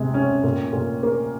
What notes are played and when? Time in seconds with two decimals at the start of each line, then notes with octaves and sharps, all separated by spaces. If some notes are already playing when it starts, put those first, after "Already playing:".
Already playing: C3 G#3
0.14 C#4
0.44 A#2
0.73 A#2
1.03 A#3